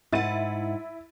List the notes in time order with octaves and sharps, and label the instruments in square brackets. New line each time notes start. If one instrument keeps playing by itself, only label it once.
[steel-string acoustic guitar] G#2 F#5 [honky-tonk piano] E4 A6 D#7